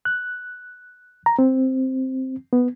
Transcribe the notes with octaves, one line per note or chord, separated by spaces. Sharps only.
F#6
A#5
C4
B3